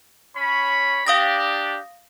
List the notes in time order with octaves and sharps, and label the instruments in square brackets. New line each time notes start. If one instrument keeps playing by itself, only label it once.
[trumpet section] C#4 C#5 B5
[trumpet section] D4 G4 [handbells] F5 D#6 A#6